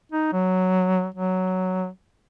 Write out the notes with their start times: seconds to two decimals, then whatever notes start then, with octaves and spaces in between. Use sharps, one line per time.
0.12 D#4
0.33 F#3
1.14 F#3